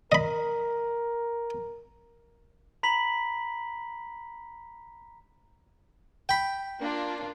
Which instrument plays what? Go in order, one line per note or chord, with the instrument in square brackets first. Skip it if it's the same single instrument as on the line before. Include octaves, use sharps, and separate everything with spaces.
[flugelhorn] A#4 [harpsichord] D#5 B5
[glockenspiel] A#5 B5 B6 F#7
[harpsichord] G5 B5
[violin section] A#3 D4 F4